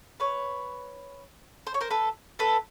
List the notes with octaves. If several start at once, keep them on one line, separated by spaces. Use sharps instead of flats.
B4 C#5
C5
C#5
A#4 C5
A4 B4
A4 B4